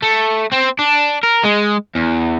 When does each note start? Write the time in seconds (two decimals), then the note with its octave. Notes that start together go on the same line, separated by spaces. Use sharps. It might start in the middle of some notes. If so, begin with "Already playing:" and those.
0.02 A3
0.53 C4
0.79 D4
1.24 A#4
1.45 G#3
1.95 E2